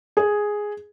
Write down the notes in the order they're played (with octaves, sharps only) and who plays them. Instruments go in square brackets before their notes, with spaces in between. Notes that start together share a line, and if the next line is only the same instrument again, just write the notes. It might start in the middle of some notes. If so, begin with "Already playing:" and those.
[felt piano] G#4